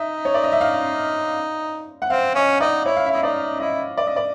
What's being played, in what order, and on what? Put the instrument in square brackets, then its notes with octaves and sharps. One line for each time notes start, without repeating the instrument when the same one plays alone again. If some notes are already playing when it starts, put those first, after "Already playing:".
Already playing: [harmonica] D#4 [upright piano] E5
[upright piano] C#5
D5
D#5
E5
F5
F#5
[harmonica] C4 [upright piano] F5
[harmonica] C#4 [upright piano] D#5
[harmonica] D#4 [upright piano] D5
[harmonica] E4 [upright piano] C#5
[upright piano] F5
E5
[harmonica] E4 [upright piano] D#5
[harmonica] D#4 [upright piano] D5
[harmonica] E4 [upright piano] D#5
[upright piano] D5
D#5
D5